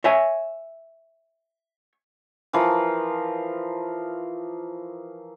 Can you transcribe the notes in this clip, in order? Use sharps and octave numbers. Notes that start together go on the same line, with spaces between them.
C#5 E5 G#5
E3 F3 A#4